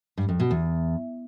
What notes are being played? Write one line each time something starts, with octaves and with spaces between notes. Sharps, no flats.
G2
F2
B2
E2